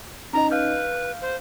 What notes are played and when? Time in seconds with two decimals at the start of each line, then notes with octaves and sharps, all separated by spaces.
0.33 C#4 D#4 D#5 A#5
0.51 B4 F5 F6 G6
1.21 C5